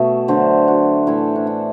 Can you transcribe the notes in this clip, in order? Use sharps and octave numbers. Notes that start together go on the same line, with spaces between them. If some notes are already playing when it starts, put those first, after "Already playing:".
Already playing: B2 A3 E5
D3 F#3 A3 C5
F#4
A2 E3 A3 E4
D4
E4